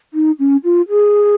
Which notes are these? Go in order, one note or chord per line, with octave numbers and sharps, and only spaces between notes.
D#4
C#4
F4
G#4